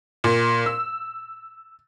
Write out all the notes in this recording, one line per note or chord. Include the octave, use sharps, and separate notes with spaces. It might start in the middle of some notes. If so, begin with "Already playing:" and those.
A#2
E6